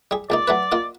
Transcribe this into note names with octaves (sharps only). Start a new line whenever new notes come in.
G3 G#4
C#2 A#3 D#4 D5
F#3 A3 B4
A#3 F4 D#5